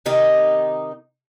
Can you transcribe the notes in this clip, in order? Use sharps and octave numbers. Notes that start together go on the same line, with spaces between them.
C3 D#3 D#4 G4